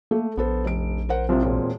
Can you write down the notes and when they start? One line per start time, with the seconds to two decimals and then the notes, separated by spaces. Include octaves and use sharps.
0.11 A3 A#3
0.37 A#1 B3 A4 C5
0.65 F1 D7
1.09 A#4 C5 F#5
1.29 C2 C3 C4 F4 C5
1.43 E1 A#2